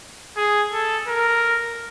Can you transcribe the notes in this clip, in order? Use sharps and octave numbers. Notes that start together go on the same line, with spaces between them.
G#4
A4
A#4